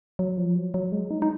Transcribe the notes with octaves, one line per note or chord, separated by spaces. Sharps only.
F#3
F3
F#3
F#3
G#3
D#4
D#4